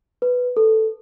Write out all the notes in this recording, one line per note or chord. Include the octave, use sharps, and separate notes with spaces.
B4
A4